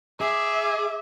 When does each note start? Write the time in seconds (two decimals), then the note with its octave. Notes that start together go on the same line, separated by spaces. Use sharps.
0.21 G#4 E5 D6